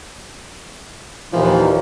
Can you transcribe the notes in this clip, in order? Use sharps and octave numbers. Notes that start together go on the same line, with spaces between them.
D#2 A#2 E3 F3